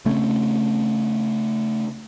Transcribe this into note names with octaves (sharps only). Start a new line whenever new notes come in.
C#3 A3 C4 C#4